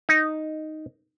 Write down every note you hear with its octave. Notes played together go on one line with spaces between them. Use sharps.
D#4